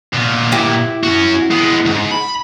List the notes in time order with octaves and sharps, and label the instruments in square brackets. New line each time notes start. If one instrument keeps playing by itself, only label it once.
[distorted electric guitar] A#2 B3
[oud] E4 G4
[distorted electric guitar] C#4 F#4
G#3 B3
D2 G#2
B5